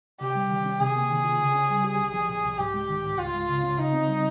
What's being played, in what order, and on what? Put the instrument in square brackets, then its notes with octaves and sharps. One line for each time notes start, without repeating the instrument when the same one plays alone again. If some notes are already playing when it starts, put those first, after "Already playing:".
[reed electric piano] C3 [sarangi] G4
[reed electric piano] G3
D#3
C#4
[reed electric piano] C3 [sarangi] G#4
[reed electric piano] A#3
D#3
F4
C#3
C#4
G3
G4
C2
F3
A#2
C2
[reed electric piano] G#2 [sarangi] G4
[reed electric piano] G#3
D#3
G#2
[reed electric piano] C#2 [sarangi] F4
[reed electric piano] G#3
C#3
C#4
[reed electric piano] C#3 [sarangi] D#4
[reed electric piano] C4
G3